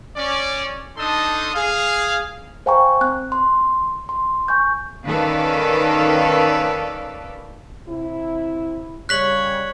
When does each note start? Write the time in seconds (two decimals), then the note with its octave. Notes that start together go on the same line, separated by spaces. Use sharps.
0.17 C#4 D5
0.98 D4 D#4 A4 A5 C6 D#6
1.54 G#4 F5
2.66 C5 F5 G5 G#5 A#5 C#6
3.01 C4 F#6
3.32 C6
4.09 C6
4.48 G#5 C#6 G6
5.06 D#3 C#4 A4 B4 D5 F5
7.87 C3 E4
9.09 C#3 G3 C#5 F#6 B6 F#7